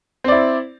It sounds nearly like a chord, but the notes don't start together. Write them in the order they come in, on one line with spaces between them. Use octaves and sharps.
C4 D5 E4